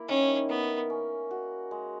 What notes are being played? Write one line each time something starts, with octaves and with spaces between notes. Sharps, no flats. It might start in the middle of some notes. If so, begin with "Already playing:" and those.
Already playing: A#3 E4
D#3 C#4
B3 A#4
C#4
F#4
G#3